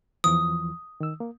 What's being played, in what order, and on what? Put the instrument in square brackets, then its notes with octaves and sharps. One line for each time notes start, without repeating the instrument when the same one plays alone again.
[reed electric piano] E2 E3 F3 [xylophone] D#6
[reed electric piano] D#3 E6
A#3